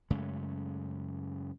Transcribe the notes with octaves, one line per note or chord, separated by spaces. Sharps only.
F#2 C#3 G#3 A3